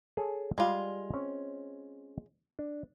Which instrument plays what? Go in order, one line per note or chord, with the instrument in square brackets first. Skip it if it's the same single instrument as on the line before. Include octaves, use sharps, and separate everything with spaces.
[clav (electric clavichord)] G#4 A4 C#5
[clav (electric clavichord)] G3 D5 [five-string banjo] G#3 F4
[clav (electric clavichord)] C4 C#4
D4